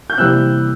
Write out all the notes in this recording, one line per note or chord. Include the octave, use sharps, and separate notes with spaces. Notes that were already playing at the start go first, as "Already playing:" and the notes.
G6
C3 E3 G3 A#3 E6 F#6